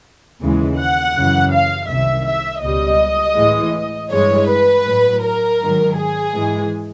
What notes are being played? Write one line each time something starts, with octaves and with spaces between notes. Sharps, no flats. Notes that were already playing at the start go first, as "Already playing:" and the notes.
D#2 C#3 E3 G#3
F#5
F#2 C#3 E3
F5
C2 C3 D#3 E5
E5
C#2 B2 G3 D#5
A2 E3 G#3
G2 E3 G#3 C#5
B4
A2 F#3
A#4
G#2 D#3 F#3
G#4
G#2 E3 G#3